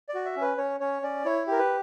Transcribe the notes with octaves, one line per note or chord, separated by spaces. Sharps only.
D5
F#4
E5
C#4
B4
C#4 C#5
C#4 C#5
C#4 D5
E4 C#5
G4 A#4
B4